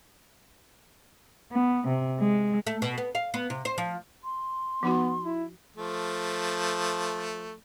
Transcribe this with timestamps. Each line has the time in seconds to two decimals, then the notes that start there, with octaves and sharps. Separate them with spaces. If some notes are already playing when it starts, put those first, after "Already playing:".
1.52 B3
1.88 C3
2.19 G#3
2.67 A3
2.82 B2
2.98 B3
3.15 F5
3.34 B3
3.50 C3
3.65 C5
3.78 F3
4.24 C6
4.83 F3 B3 D#4 F#4
5.23 E4
5.76 F3 A3